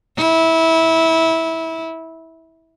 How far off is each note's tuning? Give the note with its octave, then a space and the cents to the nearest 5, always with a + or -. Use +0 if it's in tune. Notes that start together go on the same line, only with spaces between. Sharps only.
E4 -20